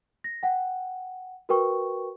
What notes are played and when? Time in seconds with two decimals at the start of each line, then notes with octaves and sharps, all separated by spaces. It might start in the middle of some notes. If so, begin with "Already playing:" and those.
0.24 A#6
0.43 F#5 G5
1.49 F#4 A#4 B4 G5 C#6